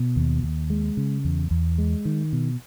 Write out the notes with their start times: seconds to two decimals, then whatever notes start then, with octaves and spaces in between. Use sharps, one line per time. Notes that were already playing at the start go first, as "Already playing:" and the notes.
Already playing: B2
0.16 D#2
0.43 D#2
0.70 G#3
0.97 C#3
1.25 E2
1.51 E2
1.78 G#3
2.05 D#3
2.33 B2